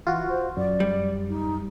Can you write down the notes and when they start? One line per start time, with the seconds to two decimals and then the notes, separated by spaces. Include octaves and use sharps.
0.07 E3 F4 F#4
0.29 C5
0.57 F#2 D5
0.80 G3
1.29 D#4